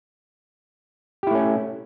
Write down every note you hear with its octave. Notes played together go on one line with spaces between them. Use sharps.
A3 C#4 E4 G4